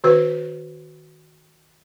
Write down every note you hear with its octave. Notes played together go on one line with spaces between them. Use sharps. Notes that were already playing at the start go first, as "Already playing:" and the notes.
D#3 F#4 B4